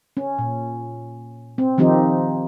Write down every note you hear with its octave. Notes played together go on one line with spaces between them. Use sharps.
C#4
A#2
C4
D#3 F3 C4 D#4 G4